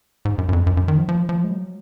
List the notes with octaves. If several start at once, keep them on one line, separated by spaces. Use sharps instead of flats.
G#2
F#2
F#2
F2
F#2
F#2
D#3
F3
F3
F3
G#3
F#3